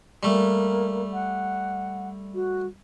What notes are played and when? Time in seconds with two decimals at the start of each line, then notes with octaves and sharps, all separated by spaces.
0.23 G3 A3 A#3
1.12 F#5
2.34 F#4